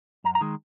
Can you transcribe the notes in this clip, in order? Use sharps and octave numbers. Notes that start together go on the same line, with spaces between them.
F#2 A#5
A#5
D#3 G#3